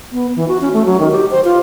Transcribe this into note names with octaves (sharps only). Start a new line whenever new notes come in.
B3
E3
F#4
C#4
A3
F#3
D#3
G4
C5
F4